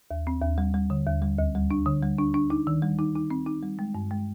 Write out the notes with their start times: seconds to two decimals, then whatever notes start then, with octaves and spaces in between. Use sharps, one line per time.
0.11 D#2
0.27 C4
0.42 D#2
0.58 G3
0.74 G3
0.90 D3
1.06 D#2
1.22 G3
1.38 D2
1.55 G3
1.71 D4
1.86 D3
2.03 G3
2.18 D4
2.34 D4
2.50 D#4
2.67 D#3
2.82 G3
2.99 D#4
3.16 D#4
3.30 C4
3.46 D#4
3.63 G3
3.79 G#3
3.95 G2
4.11 G#3